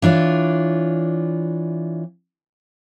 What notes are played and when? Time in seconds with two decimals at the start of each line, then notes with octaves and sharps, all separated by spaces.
0.02 E3 D4 F4 C#5